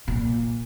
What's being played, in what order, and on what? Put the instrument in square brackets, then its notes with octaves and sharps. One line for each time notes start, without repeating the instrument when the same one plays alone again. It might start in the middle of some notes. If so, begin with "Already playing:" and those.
[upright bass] A#2